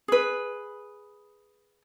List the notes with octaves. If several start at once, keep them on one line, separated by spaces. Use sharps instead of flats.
G#4 B4